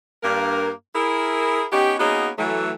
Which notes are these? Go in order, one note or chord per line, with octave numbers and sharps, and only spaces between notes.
G2 A#3 A#4
E4 G#4 A#4
B3 C#4 D#4 G4
A#3 B3 C#4 D#4 F#4 G#4
E3 F#3 A3